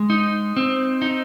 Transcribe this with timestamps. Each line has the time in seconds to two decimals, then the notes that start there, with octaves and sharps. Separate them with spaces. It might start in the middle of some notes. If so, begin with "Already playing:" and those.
Already playing: G#3
0.10 D#4
0.57 C4
1.02 D#4